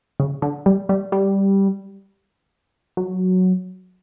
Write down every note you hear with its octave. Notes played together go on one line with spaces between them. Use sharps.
C#3
D3
G3
G3
G3
F#3